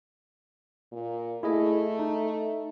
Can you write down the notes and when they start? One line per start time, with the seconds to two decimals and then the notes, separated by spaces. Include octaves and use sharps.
0.92 A#2
1.43 A3 E4 G#4 D#5
1.99 D#4